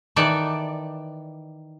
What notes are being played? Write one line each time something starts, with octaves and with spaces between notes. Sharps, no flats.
D#3 E3 A4 D5 A5